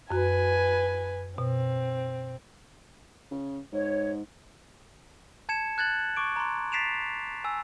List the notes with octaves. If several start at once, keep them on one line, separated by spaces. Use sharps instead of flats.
F#2 F#4 B4 G#5
B2 C4
C#3
G#2 C#5
A5 G#6 C#7 E7
F#6 G#6 A6 F#7
C#6 D6 D7
A#5 C6
A6 B6 C7 D7 E7 F7
G#5 E6